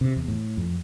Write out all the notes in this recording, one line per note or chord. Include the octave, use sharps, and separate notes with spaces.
C3
E2
A2
F2